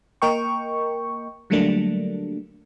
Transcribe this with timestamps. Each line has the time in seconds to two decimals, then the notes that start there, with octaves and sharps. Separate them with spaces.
0.22 A#3 A#4 D#5 G5 C#6
1.50 D3 F#3 G3 A3 A#3 D4